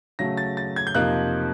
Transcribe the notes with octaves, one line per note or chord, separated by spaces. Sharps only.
C#3 F#3 A3 A#6
A6
A6
G#6
G6
F2 C3 F3 A#3 D#4 F#6